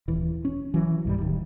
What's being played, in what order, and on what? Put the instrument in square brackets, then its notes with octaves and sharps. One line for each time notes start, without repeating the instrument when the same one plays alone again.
[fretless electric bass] D#1 E3
C#4
E3 F#3
C2 G#2 G3
D1 D#3